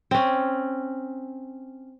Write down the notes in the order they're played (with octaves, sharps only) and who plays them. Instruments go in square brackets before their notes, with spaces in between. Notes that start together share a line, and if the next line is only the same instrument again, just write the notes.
[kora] C4 C#4